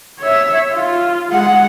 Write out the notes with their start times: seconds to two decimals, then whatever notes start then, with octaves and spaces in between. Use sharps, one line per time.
0.20 C#5 E5
0.74 F4
1.30 G#3 F#5